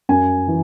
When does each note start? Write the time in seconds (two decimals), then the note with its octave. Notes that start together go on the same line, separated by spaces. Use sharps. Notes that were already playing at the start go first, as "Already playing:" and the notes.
0.09 F#2 G#5
0.48 E3